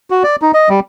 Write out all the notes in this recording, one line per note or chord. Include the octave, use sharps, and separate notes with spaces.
F#4
D5
D#4
D#5
G3